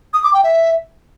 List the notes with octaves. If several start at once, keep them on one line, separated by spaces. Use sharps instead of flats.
D#6
D6
G5
E5